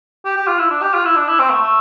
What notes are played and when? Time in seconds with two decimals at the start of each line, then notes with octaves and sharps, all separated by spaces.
0.25 G4
0.36 G4
0.48 F4
0.59 E4
0.71 D4
0.82 G4
0.94 F4
1.05 E4
1.16 D4
1.28 E4
1.39 C4
1.50 A3
1.62 A3